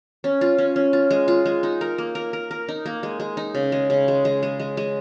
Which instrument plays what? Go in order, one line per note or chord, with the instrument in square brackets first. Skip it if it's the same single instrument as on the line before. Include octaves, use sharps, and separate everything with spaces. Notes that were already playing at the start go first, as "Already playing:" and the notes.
[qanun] C#4
F4
C#4
C#4
F4
G#3
F4
G#3
D#4
A#4
A#3
A#4
A#4
A#4
D#4
A#3
G#3
G#3
D#4
C#3
G#3
C#3
G#3
G#3
G#3
G#3
G#3